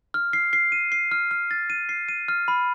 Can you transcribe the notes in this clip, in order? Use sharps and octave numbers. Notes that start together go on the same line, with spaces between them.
F6
C7
C7
D#7
C7
F6
F6
A6
D#7
C7
D#7
F6
B5